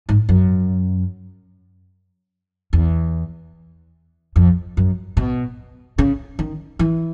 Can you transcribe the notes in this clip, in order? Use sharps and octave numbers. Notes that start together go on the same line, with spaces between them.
G#2
F#2
E2
F2
F#2
B2
C#3
D#3
E3